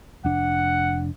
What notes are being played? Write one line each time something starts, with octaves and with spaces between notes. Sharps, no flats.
F1 D4 F#5